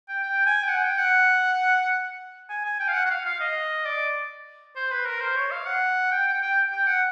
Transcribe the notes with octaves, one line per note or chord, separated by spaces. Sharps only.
G5
G5
G#5
G5
F#5
G5
F#5
G#5
G#5
G5
F5
F#5
F#5
F5
F5
D#5
D5
C5
B4
A#4
C5
C#5
F5
F#5
G5
G5
G5
G5
F#5